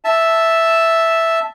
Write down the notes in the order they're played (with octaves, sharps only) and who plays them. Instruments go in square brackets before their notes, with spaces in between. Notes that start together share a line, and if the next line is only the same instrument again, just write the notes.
[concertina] E5 A5